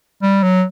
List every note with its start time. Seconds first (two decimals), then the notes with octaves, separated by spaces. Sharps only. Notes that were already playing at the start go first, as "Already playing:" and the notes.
0.22 G3
0.43 F#3